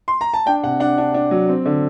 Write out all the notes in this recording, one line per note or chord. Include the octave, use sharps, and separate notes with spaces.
C6
A#5
A5
D4 G5
C3 F#5
D4 F#5
D4
D4
F#3
C4
D3